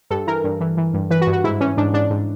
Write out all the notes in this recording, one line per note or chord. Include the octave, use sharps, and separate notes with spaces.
G2 A4
E3 A#4
G2
E3
E3
G2
E3 B4
F#4
G2
F#4
G#2 E4
E3 C#4
G#2 D4
G#2 D4
G#2